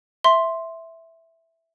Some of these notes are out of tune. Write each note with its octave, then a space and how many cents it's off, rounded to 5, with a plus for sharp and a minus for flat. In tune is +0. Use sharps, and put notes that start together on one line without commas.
E5 +0 C6 +0